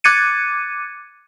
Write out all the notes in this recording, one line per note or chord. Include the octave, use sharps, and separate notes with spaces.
D6 F#6 G#6 A6 C#7 D#7